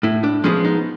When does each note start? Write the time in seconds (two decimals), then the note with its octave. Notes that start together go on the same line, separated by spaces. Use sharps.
0.03 A2 E4
0.24 D4
0.44 F3 G#3 B3 C#4
0.65 D#4